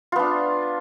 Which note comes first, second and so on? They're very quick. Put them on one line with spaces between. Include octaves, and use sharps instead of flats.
F4 B3 D4